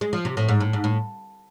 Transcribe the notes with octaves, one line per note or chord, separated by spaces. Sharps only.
G#3
F3
C3
A2
G#2
A2
G#2
A2